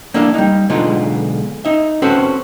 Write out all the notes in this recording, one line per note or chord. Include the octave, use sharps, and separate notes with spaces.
A#3 D4 E4 A4 F5
G3 D#4
B1 D3 G#3 B3 D#4 F4
D#4 E5
C4 C#4 F#4 A4 B4 C5